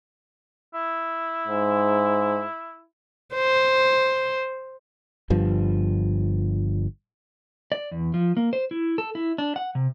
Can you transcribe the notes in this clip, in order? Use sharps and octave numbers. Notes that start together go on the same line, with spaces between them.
E4
G#2
C5
G1 G2 F3
D5
E2
F3
A#3
C5
E4
A4
E4
D4
F#5
C3